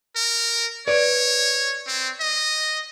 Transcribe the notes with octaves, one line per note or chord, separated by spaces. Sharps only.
A#4
B4 C#5 D5
C4
D#5